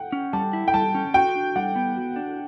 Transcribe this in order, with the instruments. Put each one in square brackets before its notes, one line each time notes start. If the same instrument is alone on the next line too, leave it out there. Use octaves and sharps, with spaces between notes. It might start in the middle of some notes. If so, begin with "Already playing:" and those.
Already playing: [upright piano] F#5 G5
[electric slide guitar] C#4
[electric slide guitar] G3 [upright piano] A5
[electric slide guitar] E4
[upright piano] G5
[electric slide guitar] G3 [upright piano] A5
[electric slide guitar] C#4
[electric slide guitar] F#4 [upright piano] G5
[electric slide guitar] D4
[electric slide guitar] G3 [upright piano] F#5
[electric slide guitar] B3
F#4
D4